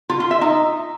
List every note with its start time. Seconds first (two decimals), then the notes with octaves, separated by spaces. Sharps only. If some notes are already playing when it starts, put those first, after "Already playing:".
0.10 F4
0.20 F4
0.31 E5
0.41 D#4